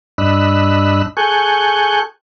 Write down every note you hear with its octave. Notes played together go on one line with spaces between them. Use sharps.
G2 D4 D#5 B5 E6 F#6
G#4 A4 G#5 C#6 F#6 G6